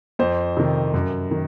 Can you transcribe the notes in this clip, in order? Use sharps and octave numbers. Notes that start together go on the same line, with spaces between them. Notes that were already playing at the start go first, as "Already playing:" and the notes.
F2 C5
C3 D#3
F#2
D#3